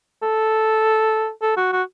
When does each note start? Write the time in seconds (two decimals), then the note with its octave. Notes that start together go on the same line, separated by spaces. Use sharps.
0.23 A4
1.42 A4
1.57 F#4
1.72 F#4